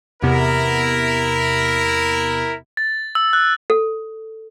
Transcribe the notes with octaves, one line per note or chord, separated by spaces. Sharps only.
E2 C3 B3 E4 A#4
A6
E6
F#6
A4